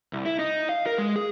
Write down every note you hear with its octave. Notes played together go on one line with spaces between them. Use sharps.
C2
E4
D#4
F5
A#4
G#3
G#4